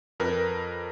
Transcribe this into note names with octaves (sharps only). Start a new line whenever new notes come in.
F2 A#4 B4